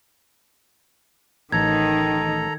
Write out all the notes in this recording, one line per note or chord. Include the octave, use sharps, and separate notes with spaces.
A1 D#3 A4 A#5 G#6